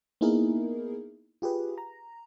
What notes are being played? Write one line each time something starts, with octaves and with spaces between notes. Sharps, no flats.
A#3 B3 D#4 E4 G#4 A#4
F4 G4 G#4 B4
A#5